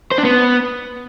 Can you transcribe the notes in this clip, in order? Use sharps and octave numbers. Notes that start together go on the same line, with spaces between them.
C5
D4
B3